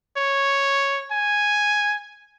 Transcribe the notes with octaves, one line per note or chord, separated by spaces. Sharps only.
C#5
G#5